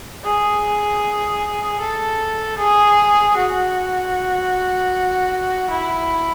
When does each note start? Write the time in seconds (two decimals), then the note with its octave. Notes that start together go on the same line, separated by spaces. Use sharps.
0.24 G#4
1.80 A4
2.58 G#4
3.37 F#4
5.70 E4